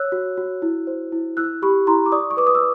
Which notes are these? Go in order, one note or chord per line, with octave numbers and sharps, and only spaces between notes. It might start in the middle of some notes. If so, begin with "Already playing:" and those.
Already playing: C#5 E6 F#6
F#4
F#4
E4
C5
E4
E4 E6 F#6
G4 B5 C#6
E4 A#5 C6
D6
D5 C#6 D#6
C#6
B4 D6
D#6
E6